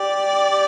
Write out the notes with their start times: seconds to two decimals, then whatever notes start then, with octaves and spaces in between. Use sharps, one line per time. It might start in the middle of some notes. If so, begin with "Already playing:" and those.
Already playing: G4 D5
0.51 G4